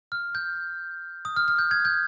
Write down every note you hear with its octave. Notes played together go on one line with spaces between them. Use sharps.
F6
G6
D#6
F6
F6
G6
G#6
G6